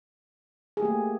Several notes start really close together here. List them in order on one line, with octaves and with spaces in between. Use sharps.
G#4 G4 A3 A#3